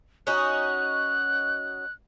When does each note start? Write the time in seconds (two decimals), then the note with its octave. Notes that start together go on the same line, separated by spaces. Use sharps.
0.27 C#4 D#4 F#4 F#6